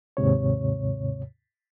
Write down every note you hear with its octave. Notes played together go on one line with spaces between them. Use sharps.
D#2 G#2 C3 C#5